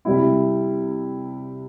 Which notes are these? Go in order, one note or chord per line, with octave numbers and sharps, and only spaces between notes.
C3 G3 E4